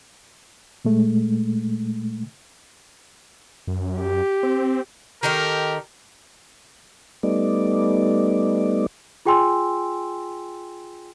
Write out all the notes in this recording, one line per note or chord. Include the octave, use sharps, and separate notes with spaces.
A#2 G#3 A3
F#2
G4
C4
D#3 D#4 G4 A4 A#4
G3 A3 B3 D#4 D5
F4 G#4 G5 G#5 C6 E6